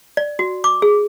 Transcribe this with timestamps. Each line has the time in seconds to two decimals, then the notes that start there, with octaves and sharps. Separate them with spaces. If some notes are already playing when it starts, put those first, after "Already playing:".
0.17 D5
0.39 F#4
0.64 D6
0.82 G#4